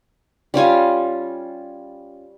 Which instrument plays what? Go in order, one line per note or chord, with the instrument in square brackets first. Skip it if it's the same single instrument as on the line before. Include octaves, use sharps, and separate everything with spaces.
[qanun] G3 C#4 F4 G#5